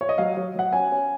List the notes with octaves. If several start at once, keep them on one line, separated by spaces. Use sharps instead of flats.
C#5
D#5
F#3 F5
F#3
F#3 F#5
C#4 G#5
C#4